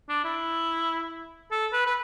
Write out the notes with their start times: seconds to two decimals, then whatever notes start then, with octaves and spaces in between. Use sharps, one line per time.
0.09 D4
0.24 E4
1.52 A4
1.73 B4
1.87 B4